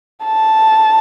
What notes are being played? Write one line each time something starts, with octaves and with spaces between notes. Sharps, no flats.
A5